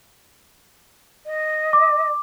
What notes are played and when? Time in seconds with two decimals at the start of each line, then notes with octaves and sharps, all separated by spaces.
1.26 D#5
1.73 D6